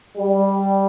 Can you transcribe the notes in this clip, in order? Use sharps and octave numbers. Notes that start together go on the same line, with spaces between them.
G3